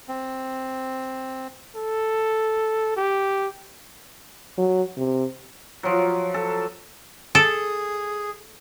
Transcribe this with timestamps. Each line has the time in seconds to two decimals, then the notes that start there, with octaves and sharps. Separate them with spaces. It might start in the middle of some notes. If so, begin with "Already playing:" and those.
0.09 C4
1.76 A4
2.96 G4
4.58 F#3
4.98 C3
5.83 F3 F#3
6.34 A4
7.35 G#4 A4